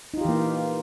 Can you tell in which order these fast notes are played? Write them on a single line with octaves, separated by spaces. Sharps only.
D#4 F4 G4 E3 A#3